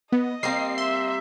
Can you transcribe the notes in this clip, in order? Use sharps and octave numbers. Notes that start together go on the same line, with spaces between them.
B3 D#5
G3 A#3 C4 C7
E5 C6